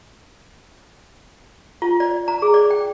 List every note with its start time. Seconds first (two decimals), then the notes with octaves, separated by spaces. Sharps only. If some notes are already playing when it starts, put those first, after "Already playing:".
1.82 F4
2.00 D5
2.28 A#5
2.42 G#4
2.54 D5
2.71 G5